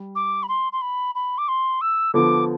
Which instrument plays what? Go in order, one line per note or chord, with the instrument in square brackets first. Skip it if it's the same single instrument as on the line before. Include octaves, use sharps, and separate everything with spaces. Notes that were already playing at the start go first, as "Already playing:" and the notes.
Already playing: [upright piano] G3
[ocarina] D6
B5
C6
C6
B5
B5
D6
C6
E6
[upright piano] D3 F3 B3 [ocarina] D6